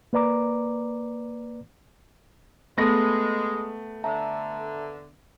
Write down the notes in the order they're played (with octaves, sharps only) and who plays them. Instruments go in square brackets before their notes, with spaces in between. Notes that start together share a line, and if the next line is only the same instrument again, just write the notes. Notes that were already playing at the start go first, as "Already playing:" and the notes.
[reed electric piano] A#3 B4 D5 A#5 D6
[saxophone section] G#3 [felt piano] A3 [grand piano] B3 A#6 [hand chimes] B5 D#6
[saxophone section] D3 [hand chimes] E5 A5 A#5